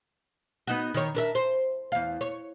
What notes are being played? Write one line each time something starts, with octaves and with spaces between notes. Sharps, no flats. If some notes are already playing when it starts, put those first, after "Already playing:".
B3 D#4 F#4
D#3 C#5
D4 A#4 E5
C5
E2 F5
C#5